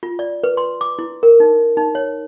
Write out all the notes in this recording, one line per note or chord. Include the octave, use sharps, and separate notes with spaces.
F4
D5
B4
C6
D6
E4
A#4
D#4
D#4
C#5